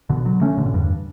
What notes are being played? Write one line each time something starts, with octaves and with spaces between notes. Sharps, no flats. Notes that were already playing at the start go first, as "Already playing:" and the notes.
B2 D3
D3 F#3
A3 C#4
B2 D3
A2
E2 G2